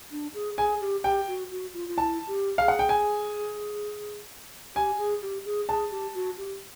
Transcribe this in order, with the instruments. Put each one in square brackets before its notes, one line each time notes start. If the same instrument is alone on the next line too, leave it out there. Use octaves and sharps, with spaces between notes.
[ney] D4
G#4
[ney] G#4 [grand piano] G#5
[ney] G4
[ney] G4 [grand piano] G5
[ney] F#4
F#4
F4
F4
[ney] E4 [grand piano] A5
[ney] G4
[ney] G#4 [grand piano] F5
[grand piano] F#5
G5
G#5
[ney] G4 [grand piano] G#5
[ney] G#4
G4
G#4
[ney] G#4 [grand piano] A5
[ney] G4
F#4
G4